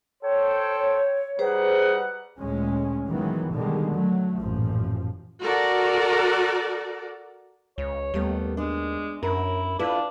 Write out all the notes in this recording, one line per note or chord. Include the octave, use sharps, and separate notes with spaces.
A4 C5 C#5 G5
G3 D#4 G#4 B4 C5 F#5
D2 A#2 G#3 C#4
D#3 E3 F#3 G#3 B3
B2 D3 D#3 G3 G#3
F#3 A3
A1 F#2 A#2 F3
F#4 A4 A#4 D5
C#2 C#5
D#2 G3 A3 B3
G#3 D4
F#2 E4 A#4
D4 E4 F4 A4 B4